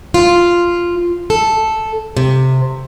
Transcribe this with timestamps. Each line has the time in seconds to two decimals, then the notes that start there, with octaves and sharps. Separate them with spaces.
0.14 F4
1.30 A4
2.17 C3